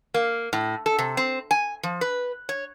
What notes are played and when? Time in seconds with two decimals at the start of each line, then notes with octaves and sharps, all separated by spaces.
0.14 A#3
0.53 A2
0.86 A4
0.99 C3
1.17 C4
1.51 G#5
1.83 F3
2.01 B4
2.49 C#5